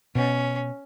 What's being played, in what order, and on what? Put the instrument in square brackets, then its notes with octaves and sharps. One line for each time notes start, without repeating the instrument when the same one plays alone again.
[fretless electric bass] B2 [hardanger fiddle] C#4